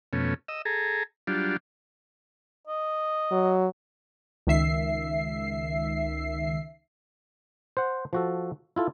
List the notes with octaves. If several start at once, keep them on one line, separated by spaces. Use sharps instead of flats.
F2 B2 A3 C#4
D#5 E6
G#4 A4 A#5
F#3 G3 D4 F4
D#5
F#3
C#2 D#3 E5 C7
C5 F#5
F3 F#4 A4
E4 F4 A4